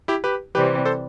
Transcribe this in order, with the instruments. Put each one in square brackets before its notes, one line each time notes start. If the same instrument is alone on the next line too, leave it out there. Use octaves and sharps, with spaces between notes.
[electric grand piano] E4 G4
G4 B4
[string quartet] C3 E3 G3 C4 [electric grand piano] G4 B4
[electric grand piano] A4 C5